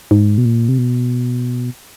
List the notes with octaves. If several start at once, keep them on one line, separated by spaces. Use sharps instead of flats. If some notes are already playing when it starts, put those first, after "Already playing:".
G#2
B2
A#2
C3
B2